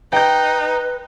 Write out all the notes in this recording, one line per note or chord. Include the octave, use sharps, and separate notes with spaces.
D#4 B4 G5 G6